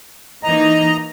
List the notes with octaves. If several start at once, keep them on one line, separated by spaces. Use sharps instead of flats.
E3 A#3 D#4 D#5 A#5